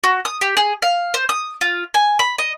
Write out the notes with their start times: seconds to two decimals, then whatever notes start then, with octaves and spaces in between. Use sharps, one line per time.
0.04 F#4
0.25 D#6
0.41 G4
0.57 G#4
0.82 F5
1.14 C5
1.29 D#6
1.61 F4
1.94 G#5
2.19 B5
2.38 D#5